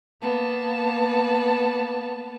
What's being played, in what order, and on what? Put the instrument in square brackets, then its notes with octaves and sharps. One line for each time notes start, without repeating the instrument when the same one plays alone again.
[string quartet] A#3 B3 A5